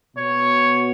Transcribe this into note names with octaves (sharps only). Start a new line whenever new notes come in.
B2 B3 C#5